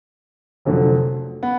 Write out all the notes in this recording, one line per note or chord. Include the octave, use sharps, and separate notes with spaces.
F1 F2 D3 F#3 A3
B3